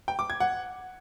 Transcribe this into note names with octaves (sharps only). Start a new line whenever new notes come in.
G5
D6
G#6
F#5